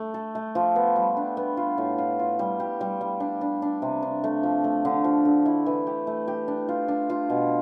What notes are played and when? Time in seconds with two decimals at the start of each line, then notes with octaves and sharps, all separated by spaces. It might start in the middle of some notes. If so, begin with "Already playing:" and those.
Already playing: A3
0.14 A4
0.35 A3
0.55 F3
0.76 B3
0.96 G3
1.17 D4
1.37 B3
1.57 F4
1.78 A2
1.98 F4
2.19 F4
2.39 G3
2.60 G4
2.81 G3
3.01 G3
3.20 D4
3.41 D4
3.62 D4
3.82 C3
4.03 D4
4.24 A3
4.43 F3
4.64 A3
4.85 D3
5.04 F3
5.25 D3
5.46 E4
5.66 E3
5.87 G4
6.07 A3
6.28 G4
6.48 D4
6.69 F4
6.88 D4
7.10 F4
7.30 B2